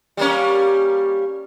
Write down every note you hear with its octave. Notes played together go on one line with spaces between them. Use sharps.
G3 A#3 C#4